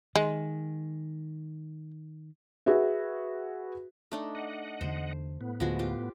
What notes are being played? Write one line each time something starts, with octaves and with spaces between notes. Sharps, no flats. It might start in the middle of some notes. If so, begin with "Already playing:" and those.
D#3 G#3
F#4 G#4 B4 E5
A3 D4 D#4
D#5 F#5
E2 D3 C5
A2 B3
D2 D3 F3 G#3 A3 F#4
F4 G4